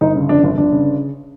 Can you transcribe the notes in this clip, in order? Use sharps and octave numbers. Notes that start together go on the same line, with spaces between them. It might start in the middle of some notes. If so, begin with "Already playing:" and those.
G1 D#4
C#3
F2 D4
G1
G1 D4
C#3